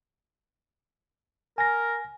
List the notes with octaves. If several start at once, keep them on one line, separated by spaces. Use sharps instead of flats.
A#4 G#5 A#6